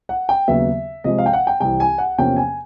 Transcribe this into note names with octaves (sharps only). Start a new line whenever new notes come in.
F#5
G5
D#2 C#3 F#3 B3 E5
C3 F3 G#3 D#5
F5
G5
F#5
G5
C2 C3 E3 G5
G#5
F#5
E2 C3 F3 A#3 C#4 G5
G#5